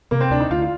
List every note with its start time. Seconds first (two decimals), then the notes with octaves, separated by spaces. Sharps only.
0.11 C3 A#3
0.21 C4
0.30 D2 D4
0.40 D#4
0.50 D2 F4
0.62 F4